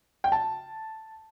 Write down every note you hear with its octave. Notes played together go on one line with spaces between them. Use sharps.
G5
A5